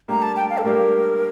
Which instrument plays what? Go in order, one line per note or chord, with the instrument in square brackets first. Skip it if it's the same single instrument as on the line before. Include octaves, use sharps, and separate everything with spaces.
[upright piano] A2 G3 A#3 D4 G4 [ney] A#5
[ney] A5
G5
F5
A4
[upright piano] A2 G3 A#3 D4 G4 [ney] A#4